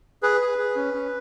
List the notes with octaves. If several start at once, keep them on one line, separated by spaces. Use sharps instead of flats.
G#4 B4
G#4
G#4
C#4
C#4